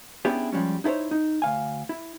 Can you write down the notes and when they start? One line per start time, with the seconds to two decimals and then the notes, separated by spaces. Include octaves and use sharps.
0.25 B3 C#4 D4 E4 G4 G#4
0.52 F3 G3 G#3 C#4
0.84 D#4 E4 A4 C5 C#5
1.11 D#4
1.42 D2 F5 G#5
1.89 E4